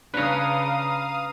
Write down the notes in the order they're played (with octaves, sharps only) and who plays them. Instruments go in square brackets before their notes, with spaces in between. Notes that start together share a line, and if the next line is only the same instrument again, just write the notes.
[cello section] C#3 [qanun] D4 C#5 [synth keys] B4 A#5 [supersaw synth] F5 D#6